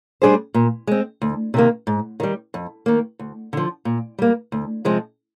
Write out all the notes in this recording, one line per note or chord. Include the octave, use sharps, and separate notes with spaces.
G3 D4 G#4 C5
A#2
G#3 C4
D2
C3 D#3 A#3
G#2
D#3 G3
F2
D#3 A#3
D2
D3 F3
A#2
G3 A#3
D2
C3 F3 G#3 C4